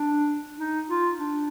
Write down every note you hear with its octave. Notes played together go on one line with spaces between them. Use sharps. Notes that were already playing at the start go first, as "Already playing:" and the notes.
Already playing: D4
D#4
F4
D4